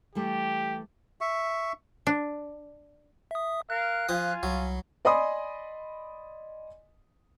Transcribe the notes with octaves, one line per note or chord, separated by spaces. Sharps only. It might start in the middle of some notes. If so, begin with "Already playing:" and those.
E3 G3 A3 G4
E5 C#6
D4
E5 D#6
A#4 F5 F#6
F3 F4 F5 G#5 D#6
C2 F#3
D5 D#5 G#5 B5 C6 D#6